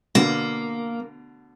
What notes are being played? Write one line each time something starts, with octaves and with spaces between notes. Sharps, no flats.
B2 D3 A#3